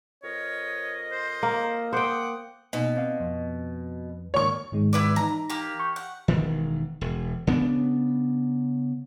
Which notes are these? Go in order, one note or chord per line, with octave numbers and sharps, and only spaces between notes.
F2 A#4 C#5 D#5
C5
A#3
C5 F#5 G5 D6 D#6
B2 A#3 D#4 G#5
C4 D5 F5
F2
G#2 D#3 A#3 C#5 C#6
G#2 D#3 G#3
E4 B4 D5
E3 D#4 A#5
A#3 G4
C#6 G6
F#5
E1 D#3
E1
C#3 B3 C4 D4